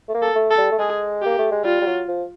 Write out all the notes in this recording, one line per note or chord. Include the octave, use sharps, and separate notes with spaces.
A3
A#3
A4
A3
A4
G3
A3
G#3 G#4
A#3 G4
A3
G#3
G3 F4
G3
F#3
F3